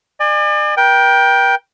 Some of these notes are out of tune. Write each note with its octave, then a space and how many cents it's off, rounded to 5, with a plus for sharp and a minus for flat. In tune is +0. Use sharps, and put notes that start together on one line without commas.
D5 +40 G#5 -20
A#4 +45 G5 +0